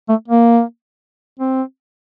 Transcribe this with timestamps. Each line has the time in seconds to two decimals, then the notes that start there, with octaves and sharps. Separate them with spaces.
0.09 A3
0.28 A#3
1.40 C4